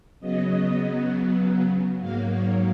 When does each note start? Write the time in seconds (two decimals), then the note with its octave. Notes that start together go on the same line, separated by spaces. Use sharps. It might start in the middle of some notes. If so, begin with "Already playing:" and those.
0.20 C#3 F#3 B3 D#5
2.00 G#2 F#3 A#3 F5
2.30 C#5